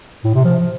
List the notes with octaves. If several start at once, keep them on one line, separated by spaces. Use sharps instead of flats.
A2
C3
F3